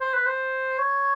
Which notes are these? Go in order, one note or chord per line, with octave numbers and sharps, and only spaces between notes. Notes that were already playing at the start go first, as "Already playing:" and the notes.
C5
B4
C5
C#5